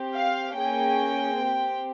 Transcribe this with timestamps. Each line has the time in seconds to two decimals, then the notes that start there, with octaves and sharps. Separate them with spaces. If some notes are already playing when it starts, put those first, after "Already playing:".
Already playing: C4 G4
0.13 F5
0.56 A#3 C#4 G#4 G5
1.40 C4 G4